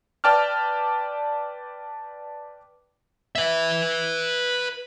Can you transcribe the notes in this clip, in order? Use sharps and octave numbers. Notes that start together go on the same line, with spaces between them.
B4 D5 G5 A5 D6 F6
B4 E5